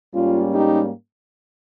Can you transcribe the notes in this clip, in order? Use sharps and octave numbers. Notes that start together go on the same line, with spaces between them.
G#2 G3 A#3 C#4 F4
D#4 G4